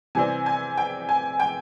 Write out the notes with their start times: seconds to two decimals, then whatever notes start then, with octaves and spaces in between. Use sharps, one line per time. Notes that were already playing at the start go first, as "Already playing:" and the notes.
0.15 C3 E3 G3 C4 G#5
0.46 G#5
0.77 G5
1.09 G#5
1.40 G5